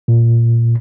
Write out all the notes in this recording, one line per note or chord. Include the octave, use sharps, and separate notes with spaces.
A#2